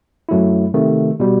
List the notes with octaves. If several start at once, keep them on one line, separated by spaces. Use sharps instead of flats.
F#2 F#3 A3 E4
C3 D#3 A3
B2 G3